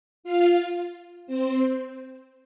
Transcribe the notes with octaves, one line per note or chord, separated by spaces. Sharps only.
F4 F5
C4 C5